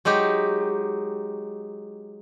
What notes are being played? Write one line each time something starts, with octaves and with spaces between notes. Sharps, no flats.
F#3 G#3 D#4 G4